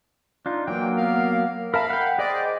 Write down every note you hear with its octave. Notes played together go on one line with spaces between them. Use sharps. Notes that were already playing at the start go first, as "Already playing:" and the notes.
D4 D#4 F4
E3 F#3 A#3 G5
B3 A#4 F5
A#4 E5 F5 A5 B5
F#5 G5
G#4 C5 D5 D#5 G5